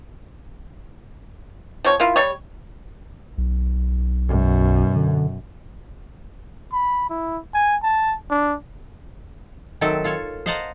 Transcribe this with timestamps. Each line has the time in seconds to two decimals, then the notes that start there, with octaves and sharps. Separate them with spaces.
1.84 F3 C4 C#5
2.00 A#3 E4 F4
2.16 G3 C#5
3.38 B1
4.28 F#2 B2
4.96 D3
6.73 B5
7.10 E4
7.54 G#5
7.83 A5
8.30 D4
9.81 D#3 F#3 C4 A4 E5
10.04 F4 A4 C#5
10.46 C5 D#5 F5 F#5 A5 A#5